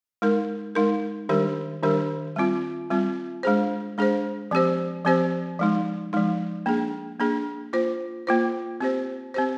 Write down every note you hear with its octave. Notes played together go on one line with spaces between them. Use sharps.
G#3 D#4 A#4
G#3 D#4 A#4
D#3 G3 D4 G4 A#4
D#3 G3 D4 G4 A#4
G3 C4 F4
G3 C4 F4
G#3 D4 G#4 C5
G#3 D4 G#4 C5
F3 C4 G4 C5
F3 C4 G4 C5
F3 G#3 D#4
F3 G#3 D#4
A#3 D4 G#4
A#3 D4 G#4
A#3 F4 C5
A#3 F4 C5
C4 G4 C5
C4 G4 C5